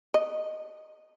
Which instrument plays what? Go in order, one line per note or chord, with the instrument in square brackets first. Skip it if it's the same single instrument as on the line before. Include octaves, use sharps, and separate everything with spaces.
[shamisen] D#5